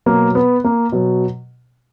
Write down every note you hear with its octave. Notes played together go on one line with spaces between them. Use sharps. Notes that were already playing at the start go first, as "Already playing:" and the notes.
B2 F#3 A#3
B3
A#3
B2 F#3